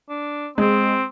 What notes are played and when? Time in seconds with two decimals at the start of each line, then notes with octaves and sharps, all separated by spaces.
0.09 D4
0.58 G#3 C4